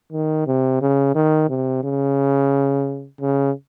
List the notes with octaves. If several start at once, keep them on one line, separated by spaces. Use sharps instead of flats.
D#3
C3
C#3
D#3
C3
C#3
C#3